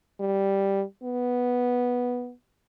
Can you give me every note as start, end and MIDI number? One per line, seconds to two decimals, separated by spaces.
0.20 0.83 55
1.03 2.32 59